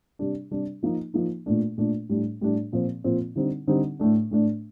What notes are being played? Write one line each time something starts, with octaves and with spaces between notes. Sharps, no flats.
C3 G3 D4
C3 G3 D4
F3 A#3 D#4
F3 A#3 D#4
A#2 A3 D4
A#2 A3 D4
A2 G3 D4
A2 G3 D4
A#2 F3 C4
A#2 F3 C4
D3 G3 C4 D#4
D3 G3 C4 D#4
A2 A3 D4
A2 A3 D4